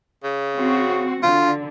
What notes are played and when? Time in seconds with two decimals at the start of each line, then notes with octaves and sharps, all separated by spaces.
0.23 C#3
0.54 C4 F#4
1.23 D3 F4